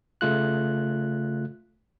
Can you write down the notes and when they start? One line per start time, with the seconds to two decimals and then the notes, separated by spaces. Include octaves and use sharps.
0.21 C#3 A3 F4 F#6